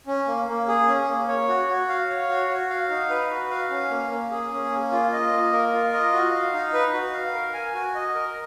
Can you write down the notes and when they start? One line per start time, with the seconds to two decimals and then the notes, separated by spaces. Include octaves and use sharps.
0.07 C#4
0.28 A#3
0.48 A#3
0.68 G#4
0.87 C#4
1.08 A#3
1.28 C#5
1.48 F#4
1.68 F#4
1.89 F5
2.09 C#5
2.29 F#4
2.49 F#4
2.70 F5
2.90 D#4
3.10 B4
3.30 F#4
3.50 F5
3.70 C#4
3.91 A#3
4.11 A#3
4.31 G#4
4.52 C#4
4.72 A#3
4.92 F4
5.12 D#5
5.32 A#3
5.52 A#4
5.72 F4
5.93 D#5
6.13 F#4
6.33 F5
6.54 D#4
6.73 B4
6.93 F#4
7.14 F5
7.34 A#4
7.54 G#5
7.74 F#4
7.95 D#5
8.15 A#4